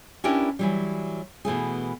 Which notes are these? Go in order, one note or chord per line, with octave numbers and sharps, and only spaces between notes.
C#4 D4 E4 G4 A#4 B4
E3 F#3 G3
B2 E3 A3 G#4